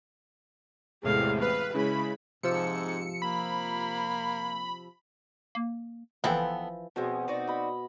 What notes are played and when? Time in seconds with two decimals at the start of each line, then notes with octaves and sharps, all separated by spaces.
1.03 E2 A2 C3 G#3 F5
1.41 B4 F5
1.74 C#3 G#3 E4 B5
2.43 G#2 C3 F3 E6 C#7
3.22 A#3 B5
5.55 A#3
6.24 F#1 E3 F3 B3 E4 A4 G5
6.96 B2 F3 G#3 C4 C#4
7.28 D#4 F#4 D5
7.47 D#5 B5